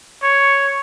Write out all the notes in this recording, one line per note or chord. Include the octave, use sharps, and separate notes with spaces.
C#5